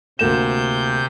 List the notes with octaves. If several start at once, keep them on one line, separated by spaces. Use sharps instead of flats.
D2 C3 A#3 G6 E7